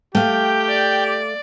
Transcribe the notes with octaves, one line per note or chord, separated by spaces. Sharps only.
A3 G4 F5 G5
D5